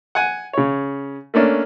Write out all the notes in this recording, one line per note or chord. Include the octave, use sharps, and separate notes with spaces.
F#5 G#5
C#3 C#5
A3 A#3 C#4 D4